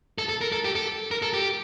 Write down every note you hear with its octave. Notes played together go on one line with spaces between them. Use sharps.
A4
A4
A#4
A4
G4
A4
A#4
A4
G4